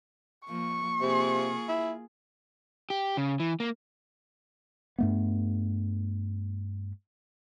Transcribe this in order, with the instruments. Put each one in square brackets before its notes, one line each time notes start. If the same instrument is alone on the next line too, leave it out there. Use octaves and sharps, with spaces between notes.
[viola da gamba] F3 A#3 [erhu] C#6
[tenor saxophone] C3 [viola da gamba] A#3 F4 G#4
[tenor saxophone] E4
[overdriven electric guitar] G4
C#3
E3
A#3
[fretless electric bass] G2 A3 B3